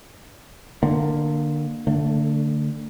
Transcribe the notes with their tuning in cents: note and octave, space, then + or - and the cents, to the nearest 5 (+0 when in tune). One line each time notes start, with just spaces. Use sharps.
D3 +25 A#3 +0
D3 +0 A3 +35